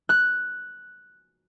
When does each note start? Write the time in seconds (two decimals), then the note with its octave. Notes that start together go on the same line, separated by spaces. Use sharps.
0.09 F#6